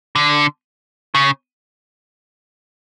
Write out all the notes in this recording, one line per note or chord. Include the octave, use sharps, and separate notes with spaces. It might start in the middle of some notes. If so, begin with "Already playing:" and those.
D3
C#3